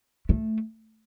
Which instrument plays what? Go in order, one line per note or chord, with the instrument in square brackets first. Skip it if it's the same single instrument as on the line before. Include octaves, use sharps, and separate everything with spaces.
[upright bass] A3